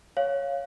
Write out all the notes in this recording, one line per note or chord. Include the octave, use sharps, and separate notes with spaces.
C#5 F5